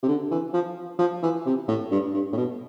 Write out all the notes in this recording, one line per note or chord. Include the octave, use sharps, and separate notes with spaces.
C3
D3
E3
F3
F3
E3
C3
A2
G2
G2
A2
B2